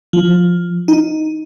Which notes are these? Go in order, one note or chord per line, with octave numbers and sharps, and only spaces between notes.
F3
D#4